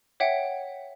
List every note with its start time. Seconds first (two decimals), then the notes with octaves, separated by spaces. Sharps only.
0.20 C#5 E5 F#5 G5